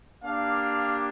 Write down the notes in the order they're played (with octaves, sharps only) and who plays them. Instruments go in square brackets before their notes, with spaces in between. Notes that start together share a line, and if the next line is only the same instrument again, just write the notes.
[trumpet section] A#3 D4 G4 F5